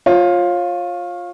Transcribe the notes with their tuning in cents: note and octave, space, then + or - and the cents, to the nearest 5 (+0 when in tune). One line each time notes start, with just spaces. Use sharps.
F4 +10 C#5 -30